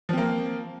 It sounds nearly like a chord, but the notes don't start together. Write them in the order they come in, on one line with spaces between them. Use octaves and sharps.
F3 C4 A#3